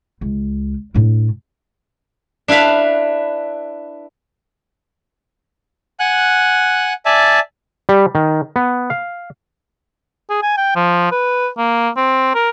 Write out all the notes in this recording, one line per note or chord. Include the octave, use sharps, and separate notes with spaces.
C#2
A2 D4
D4 E4 B4 F5 B5
F#5 G#5 F#6
D5 E5 G#5 A5
G3
D#3
B3
F5
G#4
G#5
G5
F3
B4
A#3
C4
A#4